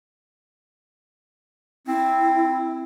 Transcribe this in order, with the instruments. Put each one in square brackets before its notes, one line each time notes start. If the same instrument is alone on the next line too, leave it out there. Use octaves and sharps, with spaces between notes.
[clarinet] C4 [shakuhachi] E4